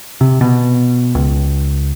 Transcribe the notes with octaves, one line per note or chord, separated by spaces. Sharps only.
C3
B2
C#2